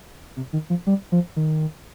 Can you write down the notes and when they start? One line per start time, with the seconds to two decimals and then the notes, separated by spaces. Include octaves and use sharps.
0.37 C3
0.53 D#3
0.70 F3
0.87 G3
1.12 F3
1.36 D#3